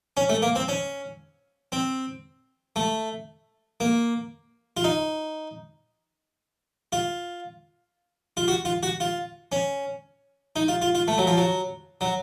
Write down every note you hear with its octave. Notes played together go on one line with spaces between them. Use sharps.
C#4
A3
A#3
C4
C#4
C4
A3
A#3
F4
D#4
F4
F4
F#4
F4
F#4
F4
C#4
D#4
F4
F4
F4
A3
F#3
F3
F#3
F#3